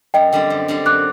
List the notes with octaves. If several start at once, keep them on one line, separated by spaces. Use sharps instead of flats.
F#2 D#5 G5
D3 G3 C4
F#2
D3 G3 C4
F#2 D6 F#6